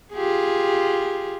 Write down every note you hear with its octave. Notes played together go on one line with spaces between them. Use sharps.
F4 G4 G#4